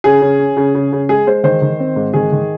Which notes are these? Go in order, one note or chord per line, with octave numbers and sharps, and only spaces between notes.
C#3 G#4
C#3
C#4
C#3
C#3
C#3
G#3 G#4
G#3 C5
D#3 C5
D#3
C4
G#2
D#3 G#4
D#3